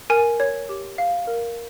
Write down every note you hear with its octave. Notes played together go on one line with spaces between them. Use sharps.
A#4 G#5
C#5
G4
F5
A#4